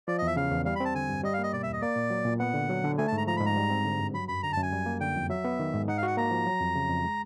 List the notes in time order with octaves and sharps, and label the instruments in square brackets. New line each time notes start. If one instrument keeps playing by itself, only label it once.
[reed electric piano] F3 [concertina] D5
[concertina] D#5
[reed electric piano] E2 [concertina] E5
[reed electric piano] C#3 [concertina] F5
[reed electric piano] E2
[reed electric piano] G3 [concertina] F5
[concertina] B5
[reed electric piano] C4 [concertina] A5
[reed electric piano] D3 [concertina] G#5
[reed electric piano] G2
[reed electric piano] G3 [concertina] D#5
[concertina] F5
[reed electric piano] A#3 [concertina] D#5
[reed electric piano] B2 [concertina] D5
[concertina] E5
[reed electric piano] E2
[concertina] D#5
[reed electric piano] A#3 [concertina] D5
[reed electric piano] A#2
F#3
A#2
[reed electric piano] B3 [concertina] F#5
[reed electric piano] D3
F#3
D3
[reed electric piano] A3 [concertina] G#5
[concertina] A5
[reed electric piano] G#2 [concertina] A#5
[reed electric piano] F3 [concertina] A#5
[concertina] B5
[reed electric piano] G#2
[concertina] A#5
[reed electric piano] G3
C4
D3
G2
[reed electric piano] F#3 [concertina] B5
[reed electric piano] F#2 [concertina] B5
[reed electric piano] D3 [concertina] A#5
[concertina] A5
[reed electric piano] F#2
[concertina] G#5
[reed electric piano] G3
A#3
[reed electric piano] D3 [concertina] G5
[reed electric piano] F2
[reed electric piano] F#3 [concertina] E5
[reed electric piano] B3
D#3
G#2
[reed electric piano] D#4 [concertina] F#5
[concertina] F5
[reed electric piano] F#4 [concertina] F#5
[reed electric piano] A#3 [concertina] A#5
[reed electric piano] F3
F#3
F2
C#3
F2
G#3